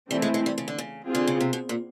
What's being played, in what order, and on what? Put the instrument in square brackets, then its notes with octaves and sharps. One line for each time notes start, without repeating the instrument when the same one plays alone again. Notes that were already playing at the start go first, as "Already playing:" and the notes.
[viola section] E3 A3 C4 E4 [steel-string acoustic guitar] G3
[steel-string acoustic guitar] G#3
G#3
G3
C#3
D3
C#3
[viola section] C4 F4 G#4
[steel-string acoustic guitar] D3
C#3
C3
B2
A#2